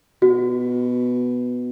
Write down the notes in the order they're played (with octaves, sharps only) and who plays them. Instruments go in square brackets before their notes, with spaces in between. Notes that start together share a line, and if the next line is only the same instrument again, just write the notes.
[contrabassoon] B2 [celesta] F#4